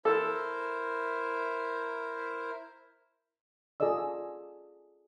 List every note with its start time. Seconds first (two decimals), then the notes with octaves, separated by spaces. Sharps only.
0.05 E4 A4 A#4 C5
3.80 F4 G#4 A4 D5 D#5 E6